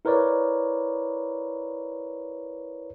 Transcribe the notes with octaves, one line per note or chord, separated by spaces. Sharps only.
E4 A#4 B4 C#5 D5